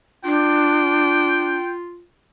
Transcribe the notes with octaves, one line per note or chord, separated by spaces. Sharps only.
D4 F4 G5